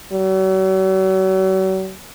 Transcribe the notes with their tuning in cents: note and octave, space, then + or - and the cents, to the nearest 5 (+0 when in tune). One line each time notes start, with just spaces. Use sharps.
F#3 +40